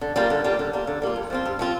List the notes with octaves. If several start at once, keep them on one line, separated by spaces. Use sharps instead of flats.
D3
G3 A#3 F4
D3
G3 A#3 F4
D3
G3 A#3 F4
D3
G3 A#3 F4
G2
F3 C4 F4
G2
F3 C4 F4